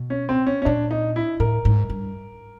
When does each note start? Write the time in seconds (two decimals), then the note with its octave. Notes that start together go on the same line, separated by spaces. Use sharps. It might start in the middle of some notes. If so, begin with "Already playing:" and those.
Already playing: B2
0.10 C#4
0.29 C4
0.46 C#4
0.62 C#4
0.65 A#2 D4
0.91 D#4
1.16 E4
1.40 A2 A#4
1.65 G#2
1.90 G2